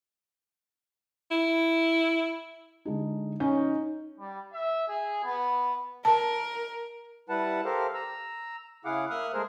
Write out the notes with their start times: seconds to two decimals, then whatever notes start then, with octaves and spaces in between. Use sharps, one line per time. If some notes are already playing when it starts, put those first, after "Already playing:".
1.31 E4
2.85 D3 G#3 D#4
3.40 C#4 D#4 G#5 G6
4.19 G3
4.52 E5
4.88 G#4
5.24 B3
6.05 A#4 A5
7.29 G3 E4 B4 F#5 A5
7.65 G4 A4 A#4 C5 F5
7.94 A#5 E6
8.85 C#3 E4 G#4 F5 F#5 D6
9.10 A#3 E5 D#6 F6 F#6
9.34 G#3 A3 G#4 A#4 C5